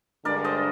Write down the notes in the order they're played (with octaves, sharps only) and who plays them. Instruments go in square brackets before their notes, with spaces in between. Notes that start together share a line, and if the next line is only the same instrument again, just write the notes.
[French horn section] G2 D3 G#3 D4 [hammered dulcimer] A#4 D5
[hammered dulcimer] C5 D#5